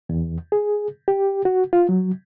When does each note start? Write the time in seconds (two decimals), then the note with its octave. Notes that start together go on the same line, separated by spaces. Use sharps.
0.09 E2
0.52 G#4
1.08 G4
1.45 F#4
1.73 F4
1.89 F#3